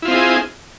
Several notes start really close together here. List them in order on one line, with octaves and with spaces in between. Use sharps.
E4 F4 C4 D#5 G#4